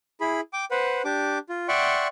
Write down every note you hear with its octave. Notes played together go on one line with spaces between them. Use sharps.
E4 G#4 B5
G5 D6
B4 C5 F#5
D4 G4 D6
F4
D5 E5 F#5 G5 C6 C#6